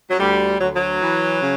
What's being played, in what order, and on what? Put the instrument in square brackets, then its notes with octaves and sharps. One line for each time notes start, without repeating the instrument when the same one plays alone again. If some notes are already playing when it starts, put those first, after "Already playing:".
[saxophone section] F#3
D2 G3
D2 F#3
F#3
E3
C#3